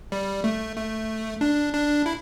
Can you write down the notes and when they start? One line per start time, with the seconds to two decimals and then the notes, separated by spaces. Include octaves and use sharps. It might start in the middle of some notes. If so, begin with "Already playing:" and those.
0.12 G3
0.44 A3
0.77 A3
1.41 D4
1.73 D4
2.06 E4